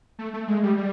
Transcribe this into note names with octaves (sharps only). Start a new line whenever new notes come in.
A3
A3
G#3
G3
G3